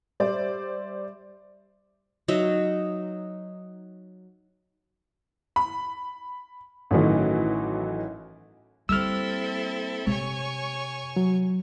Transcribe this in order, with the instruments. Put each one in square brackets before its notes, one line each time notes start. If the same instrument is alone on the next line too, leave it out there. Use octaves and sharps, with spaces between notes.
[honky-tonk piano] G3 C5 D5 E5
[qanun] F#3 D#4 E5
[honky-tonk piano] B5
[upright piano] A1 D#3 [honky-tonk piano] E3 F#3 A3
[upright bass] G3 A#3 [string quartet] C4 E4 A4 [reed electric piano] E6 F6
[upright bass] C3 [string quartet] C#5 G#5 C#6
[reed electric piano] F#3